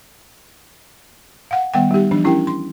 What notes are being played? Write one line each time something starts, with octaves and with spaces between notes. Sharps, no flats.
F5 F#5
D#3 G3 B3 F#5 G5
G3 D#4 G4
E3 F3 D4
C#4 E4 G4 A#4 G5
C6